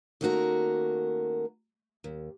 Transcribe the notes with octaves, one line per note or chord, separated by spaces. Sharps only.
D#3 A3 A#3 C#4 F#4 A#4
D#2